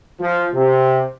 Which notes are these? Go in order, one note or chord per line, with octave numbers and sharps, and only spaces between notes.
F3
C3